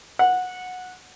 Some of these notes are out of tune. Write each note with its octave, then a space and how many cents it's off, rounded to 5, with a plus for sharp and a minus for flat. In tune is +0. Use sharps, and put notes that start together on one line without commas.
F#5 -15